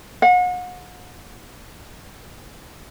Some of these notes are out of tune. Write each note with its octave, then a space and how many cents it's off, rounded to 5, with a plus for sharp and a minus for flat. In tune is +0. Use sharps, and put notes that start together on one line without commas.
F#5 -40